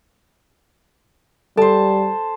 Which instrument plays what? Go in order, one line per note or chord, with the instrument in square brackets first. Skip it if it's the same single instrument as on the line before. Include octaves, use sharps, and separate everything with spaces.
[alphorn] G3 [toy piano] A4 [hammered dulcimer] C5 A5